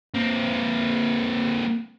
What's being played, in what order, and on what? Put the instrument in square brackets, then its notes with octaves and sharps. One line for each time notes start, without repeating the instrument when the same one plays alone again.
[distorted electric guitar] A#3 C4